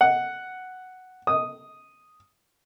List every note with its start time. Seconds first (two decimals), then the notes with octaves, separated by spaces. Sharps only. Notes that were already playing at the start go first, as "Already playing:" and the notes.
0.01 F#5
1.27 D#6